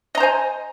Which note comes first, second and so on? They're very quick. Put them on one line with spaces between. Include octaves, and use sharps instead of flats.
D#5 A#5 C5 G#5